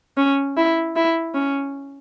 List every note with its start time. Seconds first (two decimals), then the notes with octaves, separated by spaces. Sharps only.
0.17 C#4
0.57 E4
0.96 E4
1.35 C#4